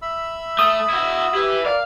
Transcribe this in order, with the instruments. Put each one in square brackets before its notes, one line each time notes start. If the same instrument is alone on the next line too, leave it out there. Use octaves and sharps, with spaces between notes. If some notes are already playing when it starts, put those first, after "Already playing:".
[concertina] E5 B5 E6
[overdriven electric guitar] A3 [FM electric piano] D#6
[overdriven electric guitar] E4 F#4
[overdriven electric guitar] E4 B4 [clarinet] G4
[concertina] A#4 [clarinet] D5 [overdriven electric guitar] F5